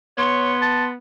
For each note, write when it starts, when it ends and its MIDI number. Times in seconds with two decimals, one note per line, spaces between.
0.18 0.97 59
0.18 0.53 73
0.18 0.89 84
0.62 0.85 81